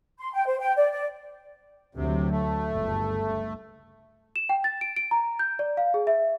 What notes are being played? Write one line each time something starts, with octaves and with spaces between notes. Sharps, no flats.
C6
G5
C5
G5
D5
D5
D2 C3 F#3
A3
G1 C#2
E7
G5
A6
D7
D7
A#5
G6
D5
F5
G#4
E5